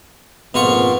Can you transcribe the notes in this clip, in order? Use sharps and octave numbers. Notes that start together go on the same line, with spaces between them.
F2 G#2 B2 A#3 F4 C#6